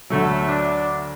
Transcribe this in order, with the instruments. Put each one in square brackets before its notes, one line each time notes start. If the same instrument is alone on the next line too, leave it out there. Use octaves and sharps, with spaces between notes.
[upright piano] D2 D3 F#3 [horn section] A3
[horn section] D4